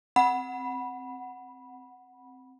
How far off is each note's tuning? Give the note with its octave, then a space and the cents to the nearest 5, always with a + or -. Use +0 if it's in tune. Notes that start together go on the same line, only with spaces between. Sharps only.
C4 +0 F#5 +0 B5 -15